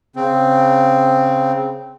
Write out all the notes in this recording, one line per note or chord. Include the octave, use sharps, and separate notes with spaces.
C#3 C4